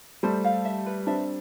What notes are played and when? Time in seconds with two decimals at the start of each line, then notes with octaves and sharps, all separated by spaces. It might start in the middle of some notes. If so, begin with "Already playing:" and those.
0.23 G3 A3 C5
0.44 F5
0.65 E5
0.86 B4
1.07 C4 D4 E5